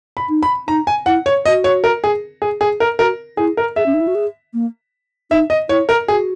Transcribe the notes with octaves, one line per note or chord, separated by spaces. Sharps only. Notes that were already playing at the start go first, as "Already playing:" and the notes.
B5
D#4
B5
D#4 A#5
G#5
E4 F#5
C#5
F#4 D#5
C#5
A#4
G#4
G#4
G#4
A#4
F#4 A#4
E4 G#4
A#4
G#4 E5
C#4
D#4
E4
F#4
G#4
A#3
D#4 E5
D#5
E4 C#5
A#4
F#4 G#4